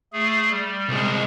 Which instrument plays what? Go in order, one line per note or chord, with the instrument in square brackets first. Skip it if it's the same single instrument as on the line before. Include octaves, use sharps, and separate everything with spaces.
[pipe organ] A3 G#4
G3
[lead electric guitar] C2 G#3